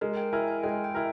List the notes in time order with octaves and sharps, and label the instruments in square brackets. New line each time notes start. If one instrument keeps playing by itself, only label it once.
[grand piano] G#3 [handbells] A#4
[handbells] G5
[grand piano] E4 A#4 [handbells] G#5
[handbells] G#5
[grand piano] G#3 [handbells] G5
[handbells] G5
[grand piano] E4 A#4